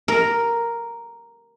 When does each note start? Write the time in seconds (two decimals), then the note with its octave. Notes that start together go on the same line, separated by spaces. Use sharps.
0.08 A#4